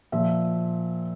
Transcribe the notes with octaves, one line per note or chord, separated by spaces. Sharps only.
A#2 F3 E5